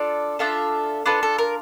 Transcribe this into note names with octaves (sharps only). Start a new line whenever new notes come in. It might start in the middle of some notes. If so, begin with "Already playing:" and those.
Already playing: D4 F4 A4 D5
D4 F4 A4 E5
D4 F4 A4 B4
A4
A#4